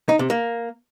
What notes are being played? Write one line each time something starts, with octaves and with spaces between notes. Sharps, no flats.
D#4
C3
A#3